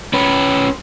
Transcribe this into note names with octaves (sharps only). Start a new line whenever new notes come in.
C#4 B4